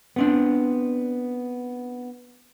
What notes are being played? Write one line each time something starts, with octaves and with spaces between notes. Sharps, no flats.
B3 C4 D4